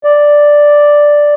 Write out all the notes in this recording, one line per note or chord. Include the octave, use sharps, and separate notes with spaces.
D5